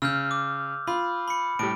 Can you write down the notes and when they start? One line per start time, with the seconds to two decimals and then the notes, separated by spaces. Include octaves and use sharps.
0.02 C#3 E6 F6 G6
0.31 D6
0.87 F4 B5
1.28 B5 C#7
1.59 A2 G3 D7